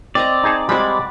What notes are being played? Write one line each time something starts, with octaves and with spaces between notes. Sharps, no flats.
C4 D5 D#5 A#5
D#4 G#4 A5
G3 G#3 C4 F#4 B5